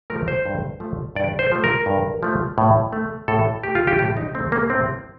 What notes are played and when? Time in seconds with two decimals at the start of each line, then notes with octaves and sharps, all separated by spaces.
0.10 F3 A3 A#4
0.28 C5
0.45 G2
0.80 F3 A3
1.15 G2 D5
1.39 C5
1.52 F3 A3
1.64 A#4
1.86 G2
2.23 F3 A3
2.58 A2
2.93 A3
3.28 A2 A4
3.63 A3 G4
3.75 F4
3.87 G4
3.99 A2 G4
4.17 D#4
4.35 A3 C4
4.52 A#3
4.70 A2 C4